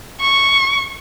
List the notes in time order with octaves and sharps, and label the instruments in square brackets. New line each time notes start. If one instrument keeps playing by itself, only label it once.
[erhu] C#6